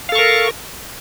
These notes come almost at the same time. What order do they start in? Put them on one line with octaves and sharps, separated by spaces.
F5 A4 C#6 A#4